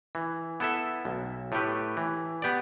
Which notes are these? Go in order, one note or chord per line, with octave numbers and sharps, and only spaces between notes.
E3
B3 E4 A4 E5
B1
A2 A3 G4 B4
E3
B3 G4 D5